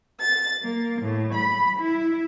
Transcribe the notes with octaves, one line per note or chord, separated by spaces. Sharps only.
A6
A#3
A2
B5
E4